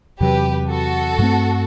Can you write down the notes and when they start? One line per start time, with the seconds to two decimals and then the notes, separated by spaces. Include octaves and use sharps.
0.20 E2 C3 F#3 G4 B4
0.69 F#4 A4
1.18 G2 E3 A3 C4